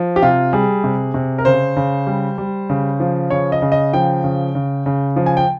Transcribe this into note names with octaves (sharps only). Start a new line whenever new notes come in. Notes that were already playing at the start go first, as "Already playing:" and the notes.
Already playing: F3
G4
C3 F4
G3 G#4
C3
C3
A#4
C#3 C5
C#3
G3
G3
C#3
F3
C#3 C#5
D#5
C#3
D#5
F3 G5
C#3
C#3
C#3
F3
G#5
G5